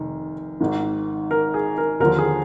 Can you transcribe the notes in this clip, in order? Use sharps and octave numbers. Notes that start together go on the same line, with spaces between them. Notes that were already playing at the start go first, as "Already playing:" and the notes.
Already playing: F1 D#3
G#1 G#2 D#3
A#4
G#4
A#4
D#2 D3 F3 A#4
G#4